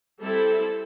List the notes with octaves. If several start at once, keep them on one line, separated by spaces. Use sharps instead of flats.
G3 C4 E4 A4